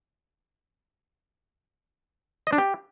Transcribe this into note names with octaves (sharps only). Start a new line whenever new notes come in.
D#5
D4
G4